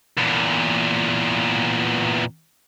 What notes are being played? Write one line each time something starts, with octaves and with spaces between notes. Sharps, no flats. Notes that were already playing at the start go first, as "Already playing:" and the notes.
E2 A#2